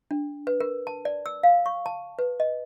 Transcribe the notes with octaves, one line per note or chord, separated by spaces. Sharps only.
D4
B4
A#4
A5
D5
E6
F5
C#6
A5
B4
D#5